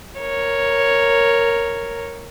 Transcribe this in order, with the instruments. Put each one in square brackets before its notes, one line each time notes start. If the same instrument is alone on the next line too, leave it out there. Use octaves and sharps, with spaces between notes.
[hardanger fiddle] A#4 C#5